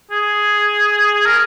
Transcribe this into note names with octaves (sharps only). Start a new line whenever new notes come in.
G#4
G#4
A#4